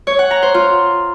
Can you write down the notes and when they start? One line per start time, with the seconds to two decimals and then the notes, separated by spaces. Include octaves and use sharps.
0.07 C#5
0.19 F#5
0.31 A#5
0.43 C5
0.54 F4